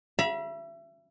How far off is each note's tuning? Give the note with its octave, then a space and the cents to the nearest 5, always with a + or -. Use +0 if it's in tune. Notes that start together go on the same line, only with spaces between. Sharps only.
E5 +30 B5 -35